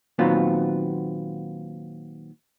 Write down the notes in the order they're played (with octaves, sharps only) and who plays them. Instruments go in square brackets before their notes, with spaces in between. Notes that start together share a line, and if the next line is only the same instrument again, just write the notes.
[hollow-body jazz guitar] A#2 D#3 F#3 B3 C4 F4